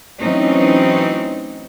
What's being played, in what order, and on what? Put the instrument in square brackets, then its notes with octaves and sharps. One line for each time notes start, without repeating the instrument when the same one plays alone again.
[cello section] E3 F#3 A3 C4 C#4 D#4